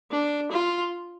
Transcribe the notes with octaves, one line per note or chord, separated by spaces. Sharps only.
D4
F4